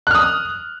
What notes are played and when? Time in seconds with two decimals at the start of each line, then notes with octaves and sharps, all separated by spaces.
0.07 F#6
0.11 F6
0.15 D#6